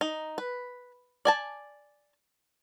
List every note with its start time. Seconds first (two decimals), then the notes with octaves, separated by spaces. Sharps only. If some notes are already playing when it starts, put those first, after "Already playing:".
0.01 D#4
0.38 B4
1.25 D5 G#5 A5